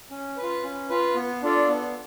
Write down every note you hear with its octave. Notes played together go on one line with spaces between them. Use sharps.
C#4
B4
F4
C#4
F4 B4
B3
D4 F4 A4 D5
B3